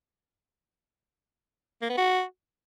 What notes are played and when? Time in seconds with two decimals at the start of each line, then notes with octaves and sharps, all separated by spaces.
1.82 A#3
1.90 B3
1.97 F#4